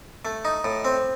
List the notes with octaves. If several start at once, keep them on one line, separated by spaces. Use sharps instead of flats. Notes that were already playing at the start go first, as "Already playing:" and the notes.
A3
D#4
A2
C4